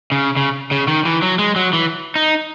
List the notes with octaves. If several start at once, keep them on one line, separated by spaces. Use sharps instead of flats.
C#3
C#3
C#3
D#3
E3
F#3
G#3
F#3
E3
D#4